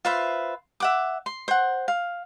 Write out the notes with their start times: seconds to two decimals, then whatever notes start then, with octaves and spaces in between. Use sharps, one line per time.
0.05 F4 B4 C5 E5
0.80 E5 F#5 D6
1.26 C6
1.48 C5 F#5
1.88 F5